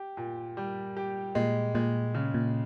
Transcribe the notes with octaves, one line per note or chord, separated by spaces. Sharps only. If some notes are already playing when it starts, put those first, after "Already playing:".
Already playing: G4
A#2
G3
G4
A#2 G#3
A#2 G#3
C#3
A#2